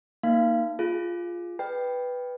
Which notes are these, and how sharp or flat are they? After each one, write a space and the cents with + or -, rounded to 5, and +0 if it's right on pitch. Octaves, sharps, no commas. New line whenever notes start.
A#3 +0 D#4 +0 F5 -30
F4 -5 G#4 +0
B4 +0 D5 +45 G5 +5